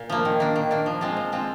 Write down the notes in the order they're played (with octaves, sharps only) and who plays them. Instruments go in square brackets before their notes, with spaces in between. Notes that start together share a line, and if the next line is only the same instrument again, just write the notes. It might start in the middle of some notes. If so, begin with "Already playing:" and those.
Already playing: [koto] A#2
F3 A#3
D#3
A#3 D4
D#3
A#3 D4
F3
G#3 C4 F4
F3
G#3 C4 F4